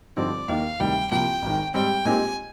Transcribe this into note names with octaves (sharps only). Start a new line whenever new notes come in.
G2 D3 F3 C4 D#4 D5
D#2 D#3 A#3 F5
D2 C3 D#3 G3 G5
C2 A#2 F3 G5
G#1 G#2 D#3
G#2 G3 C4 G4 G5
A#2 G#3 C4 D#4 G4 G#5